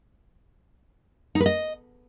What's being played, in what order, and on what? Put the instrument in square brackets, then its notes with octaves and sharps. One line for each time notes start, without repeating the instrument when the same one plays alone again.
[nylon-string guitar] D#4
B4
D#5